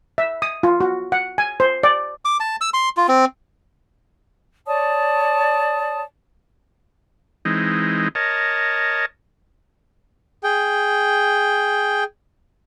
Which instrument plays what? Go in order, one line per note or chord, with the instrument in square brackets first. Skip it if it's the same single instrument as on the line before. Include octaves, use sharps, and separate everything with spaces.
[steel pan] E5
D#6
F4
F#4
F#5
G#5
C5
D5
[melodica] D6
A5
E6
C6
F4
C4
[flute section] C#5 D5 A5 D#6
[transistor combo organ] E3 G#3 C4 D#4
A#4 C#5 D#5 A5
[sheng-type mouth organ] G#4 G5